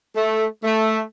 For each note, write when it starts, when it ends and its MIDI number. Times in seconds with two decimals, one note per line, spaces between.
0.16 0.45 57
0.64 1.00 57